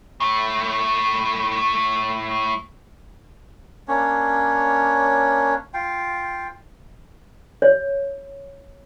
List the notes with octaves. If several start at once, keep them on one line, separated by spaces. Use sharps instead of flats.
A2 A3
A#3 C#4 D4 C#5
F4 F5 G5
C#5